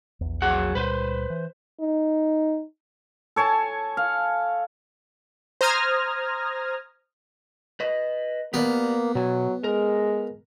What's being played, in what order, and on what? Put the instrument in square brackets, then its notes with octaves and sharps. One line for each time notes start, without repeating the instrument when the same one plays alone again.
[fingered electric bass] A#1 E2
[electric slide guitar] F#3 G#4 F#5
[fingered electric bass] C#2 A#2 G3 [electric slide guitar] B4 C5
[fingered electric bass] E3
[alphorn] D#4
[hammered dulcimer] A4 C#5 G#5 A5
F5
[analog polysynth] C5 A#5 D#6 F6 G#6 A#6
[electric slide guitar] B4 D#5
[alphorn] A#3 [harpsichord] B3 [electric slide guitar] G4 A#4 D5
[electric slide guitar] B2 G#5 [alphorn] F#3
[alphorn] G#3 [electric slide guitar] A#4